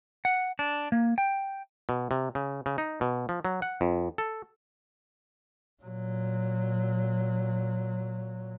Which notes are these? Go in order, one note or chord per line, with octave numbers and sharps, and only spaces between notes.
F#5
D4
A#3
G5
B2
C3
C#3
C#3
D#4
B2
F3
F#3
F#5
F2
A4
A#2 F#3